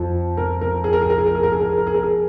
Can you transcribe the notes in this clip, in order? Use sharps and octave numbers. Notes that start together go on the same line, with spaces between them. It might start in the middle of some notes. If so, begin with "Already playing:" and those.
Already playing: F2 F3
A#4
A#4
G#4
A#4
G#4
A#4
G#4
A#4
G#4
A#4
G#4
A#4
G#4
A#4
G#4
A#4
G#4